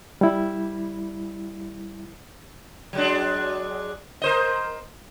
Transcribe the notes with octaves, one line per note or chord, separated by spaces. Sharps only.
G3 E4
F#3 G#3 D4
A#4 C5 D#5